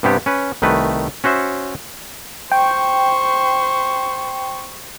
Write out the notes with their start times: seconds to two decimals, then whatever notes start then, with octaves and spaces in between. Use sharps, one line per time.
0.03 G2 C3 B3 G4
0.26 C#4 B4
0.62 C2 D#3 A3 B4
1.24 C#4 F#4 C5 E5
2.52 C5 G5 C#6